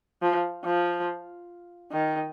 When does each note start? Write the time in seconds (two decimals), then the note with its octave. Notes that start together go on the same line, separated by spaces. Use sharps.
0.22 F3
0.64 F3
1.92 D#3